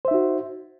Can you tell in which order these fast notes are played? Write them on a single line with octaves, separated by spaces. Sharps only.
C5 E5 D#4 F#4